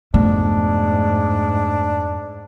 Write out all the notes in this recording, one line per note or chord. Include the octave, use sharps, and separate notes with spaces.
F2 G#2 B2 A3 D4